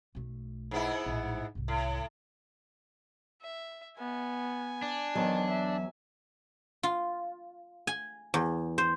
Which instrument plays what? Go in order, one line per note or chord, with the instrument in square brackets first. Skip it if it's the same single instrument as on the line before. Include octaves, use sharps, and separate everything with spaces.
[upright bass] B1 A3
[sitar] G#2 B3 E4
[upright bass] A#1 A2
C2 G#2
[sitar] A2
[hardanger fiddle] E5
[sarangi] B3 [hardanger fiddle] G#5
[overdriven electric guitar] D4
[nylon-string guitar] E2 F#3 A5 [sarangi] D#3
[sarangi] E5
[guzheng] F4
G#5
E2
C5